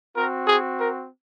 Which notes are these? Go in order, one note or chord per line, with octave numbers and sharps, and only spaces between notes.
C4 F#4 A#4
G#4
A#4